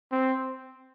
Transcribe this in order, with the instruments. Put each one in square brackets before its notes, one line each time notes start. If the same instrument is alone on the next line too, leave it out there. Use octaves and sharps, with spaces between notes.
[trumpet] C4